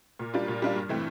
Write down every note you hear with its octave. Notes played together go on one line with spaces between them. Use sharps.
A#2
G3 D4 F4
A#2
G3 D4 F4
G2
E3 A3 C4